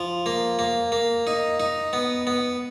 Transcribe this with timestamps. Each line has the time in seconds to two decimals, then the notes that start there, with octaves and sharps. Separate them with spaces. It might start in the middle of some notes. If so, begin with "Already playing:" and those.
Already playing: F3
0.26 A#3
0.59 A#3
0.92 A#3
1.27 D#4
1.60 D#4
1.93 B3
2.27 B3